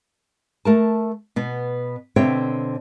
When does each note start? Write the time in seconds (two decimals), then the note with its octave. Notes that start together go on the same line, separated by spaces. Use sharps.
0.65 A3 A#4 A5
1.36 B2 B3
2.16 B2 D3 C4 C#5 E5 G5